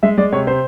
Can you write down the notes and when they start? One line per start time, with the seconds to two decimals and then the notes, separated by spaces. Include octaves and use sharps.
0.03 G#3 E5
0.18 G#3 D5
0.32 C3 C#5
0.47 C3 C5